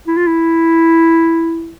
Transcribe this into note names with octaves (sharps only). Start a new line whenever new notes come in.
E4
F4
E4